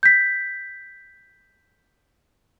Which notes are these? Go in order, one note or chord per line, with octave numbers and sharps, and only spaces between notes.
G6 B6